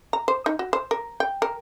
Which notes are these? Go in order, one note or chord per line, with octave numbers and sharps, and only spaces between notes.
A#5
C5
D#4
F#4
C5
A#4
G5
A#4